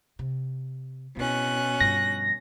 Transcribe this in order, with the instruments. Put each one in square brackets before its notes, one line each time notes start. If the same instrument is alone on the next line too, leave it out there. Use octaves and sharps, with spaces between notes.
[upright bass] C3
[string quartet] B2 C#4 F#6 [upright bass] C4 E4
[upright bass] G2 F3 [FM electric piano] A#6